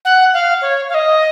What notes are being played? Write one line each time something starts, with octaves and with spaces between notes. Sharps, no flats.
F#5
F5
C#5
F5
D#5